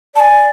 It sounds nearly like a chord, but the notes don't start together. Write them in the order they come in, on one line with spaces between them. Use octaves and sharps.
D5 A5 G#5